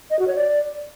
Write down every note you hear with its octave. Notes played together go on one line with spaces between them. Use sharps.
D#5
F#4
C#5
D5